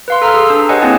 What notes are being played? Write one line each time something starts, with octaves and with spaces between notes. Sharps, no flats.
B4 F5 C6
A4 A#5 E6 F6
G#4
D4
G4 B4 C#5 D#5 F#5 G#5
A#3 C4 E4 G#4 G5 A5